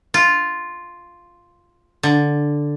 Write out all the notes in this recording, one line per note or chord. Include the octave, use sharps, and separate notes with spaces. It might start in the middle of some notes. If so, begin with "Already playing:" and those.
F4
D3